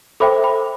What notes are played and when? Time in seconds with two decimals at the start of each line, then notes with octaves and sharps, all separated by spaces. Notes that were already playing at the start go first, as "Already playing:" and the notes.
0.20 A4 C5 E5 G5 B5 D6
0.43 G5 B5